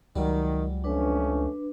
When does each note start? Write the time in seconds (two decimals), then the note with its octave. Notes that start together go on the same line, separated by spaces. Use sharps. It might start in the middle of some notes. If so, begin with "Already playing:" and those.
0.16 C#2 D#3 F#3 G3
0.84 F2 A3 C#4 D4 B4